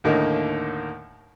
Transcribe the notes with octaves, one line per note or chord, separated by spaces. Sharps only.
D#2 A2 D3 A#3 D#4